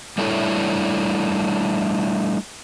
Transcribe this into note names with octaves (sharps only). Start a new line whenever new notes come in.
G3 A3 D4 E4 A4 C#5